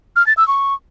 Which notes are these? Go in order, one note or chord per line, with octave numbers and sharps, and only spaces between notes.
F6
A6
E6
C#6